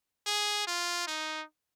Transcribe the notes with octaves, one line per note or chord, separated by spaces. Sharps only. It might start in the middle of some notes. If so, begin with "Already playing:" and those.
G#4
F4
D#4